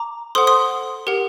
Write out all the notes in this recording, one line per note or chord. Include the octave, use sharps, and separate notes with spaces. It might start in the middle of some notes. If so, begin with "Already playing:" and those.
Already playing: A#5 D6
A4 C5 F#5 C6 D#6
C6 D#6
G4 A#4 F#5